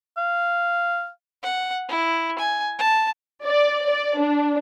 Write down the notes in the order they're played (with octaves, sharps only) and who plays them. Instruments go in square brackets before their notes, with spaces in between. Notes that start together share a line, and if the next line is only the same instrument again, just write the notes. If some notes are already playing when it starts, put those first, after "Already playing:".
[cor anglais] F5
[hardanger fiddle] F#5
E4
G#5
A5
[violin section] D5
D5
D4